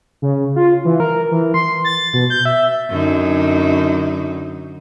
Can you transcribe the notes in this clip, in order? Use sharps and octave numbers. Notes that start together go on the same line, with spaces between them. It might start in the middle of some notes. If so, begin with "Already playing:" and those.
C#3
F4
E3
A#4
E3
C6
A6
B2
G6
E5
F#2 D3 D#4